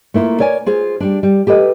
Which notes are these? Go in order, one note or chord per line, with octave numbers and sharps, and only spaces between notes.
A3 A#3 E4 F4
A#4 C#5 D5 G#5
F4 G#4 C5
G3 D4
G3
G4 A4 B4 D#5